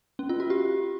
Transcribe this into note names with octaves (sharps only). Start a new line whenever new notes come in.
C#4
F4
F#4
G4